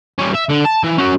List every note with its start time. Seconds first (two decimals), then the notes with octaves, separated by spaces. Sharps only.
0.19 G3 C#4
0.35 E5
0.50 D3
0.66 A5
0.84 E3
0.98 C#4 F#4